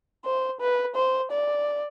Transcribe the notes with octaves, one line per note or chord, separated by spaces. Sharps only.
C5
B4
C5
D5